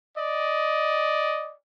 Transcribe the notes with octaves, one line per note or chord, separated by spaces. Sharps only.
D5 D#5